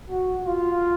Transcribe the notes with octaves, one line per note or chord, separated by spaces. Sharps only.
F#4
F4